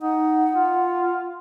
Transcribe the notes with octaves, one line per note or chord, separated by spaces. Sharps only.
D#4 F#5
F4